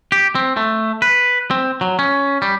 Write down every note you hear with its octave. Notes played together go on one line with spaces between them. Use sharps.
G4
C4
A3
B4
C4
F#3
C#4
G3